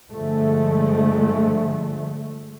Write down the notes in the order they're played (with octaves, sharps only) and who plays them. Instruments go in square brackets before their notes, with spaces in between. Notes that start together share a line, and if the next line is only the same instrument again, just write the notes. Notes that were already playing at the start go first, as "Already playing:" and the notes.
[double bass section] G2 D3 F3 G#3 A3